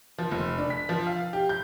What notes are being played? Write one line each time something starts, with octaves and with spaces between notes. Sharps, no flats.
F3
F1
D4
B6
F3
F5
G4
G6